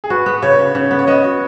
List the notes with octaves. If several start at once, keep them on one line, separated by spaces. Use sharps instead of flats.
G#4
F#4 B4
B3
C#3 C#5
C#3
C#3
B3
C#5
B3 D#5
F#4